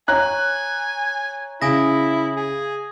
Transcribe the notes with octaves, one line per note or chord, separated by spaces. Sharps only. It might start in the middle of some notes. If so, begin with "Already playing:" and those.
C#5 G#5 A#5 F#6
C#3 E4 G#5 D#6 A#6
G#4